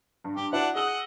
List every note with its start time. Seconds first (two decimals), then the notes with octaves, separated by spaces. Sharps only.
0.24 G2
0.36 G2 G4
0.53 D4 E4 F#4 B4 F#5
0.75 G#4 D#5 F#5 E6 F#7